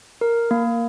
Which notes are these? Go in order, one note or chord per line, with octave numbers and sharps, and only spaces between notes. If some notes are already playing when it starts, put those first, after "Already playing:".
A#4
A#3